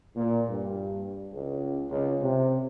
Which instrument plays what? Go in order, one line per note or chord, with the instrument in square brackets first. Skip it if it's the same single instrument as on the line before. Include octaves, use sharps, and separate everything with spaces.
[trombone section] A#2
G2
C#2
C#2
C3